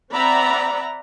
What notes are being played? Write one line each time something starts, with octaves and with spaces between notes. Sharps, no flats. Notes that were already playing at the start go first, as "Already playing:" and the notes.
C4 D5 E5 F#5 A#5 B5